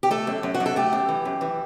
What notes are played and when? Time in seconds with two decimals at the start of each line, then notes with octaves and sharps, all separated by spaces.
0.03 G4
0.11 A3 A4
0.27 F#2
0.43 F#2
0.54 F#4
0.60 F#2
0.66 A4
0.76 A3 G4
0.93 F#2
1.09 E3
1.25 F#2
1.41 E3